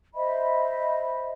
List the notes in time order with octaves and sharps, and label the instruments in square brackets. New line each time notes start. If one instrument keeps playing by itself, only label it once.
[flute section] C5 D#5 E5 B5